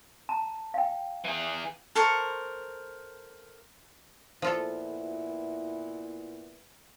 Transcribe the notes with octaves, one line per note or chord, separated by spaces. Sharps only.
A5 A#5
F5 G5
E3 G#4
A4 A#4 C5 C#6
A#2 F3 B3 E4 F4 A4